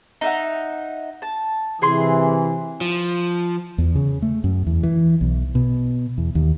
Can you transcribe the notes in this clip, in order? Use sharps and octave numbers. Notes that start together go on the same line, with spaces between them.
D#4 E5 F#5
A5
C3 E3 G#4 C6
F3
E2
C#3
A3
F#2
E2
E3
B1
B2
E2
D#2